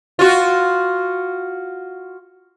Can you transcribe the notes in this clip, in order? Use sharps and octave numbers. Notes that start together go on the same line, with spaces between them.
F4 F#4